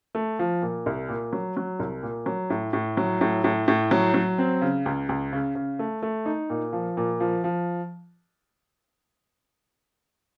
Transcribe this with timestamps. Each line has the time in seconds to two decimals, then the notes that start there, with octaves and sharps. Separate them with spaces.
0.15 A3
0.39 F3
0.62 A#2
0.86 C2
1.09 A#2
1.33 F#3
1.57 F#3
1.80 C2
2.03 A#2
2.26 F#3
2.50 A2
2.73 A2
2.97 F#3
3.21 A2
3.44 A2
3.68 A2
3.91 F#3
4.14 F#3
4.38 C4
4.62 C#3
4.86 C#2
5.09 C#2
5.33 C#3
5.55 C#3
5.79 A3
6.02 A3
6.26 D#4
6.50 A#2
6.73 F3
6.97 A#2
7.20 F3
7.44 F3